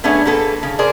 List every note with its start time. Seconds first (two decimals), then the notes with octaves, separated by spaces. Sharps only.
0.04 A3 B3 C#4 D4 G#4
0.26 A#3 G#4 A4 B4
0.63 C#3
0.79 G#4 A#4 C5 D5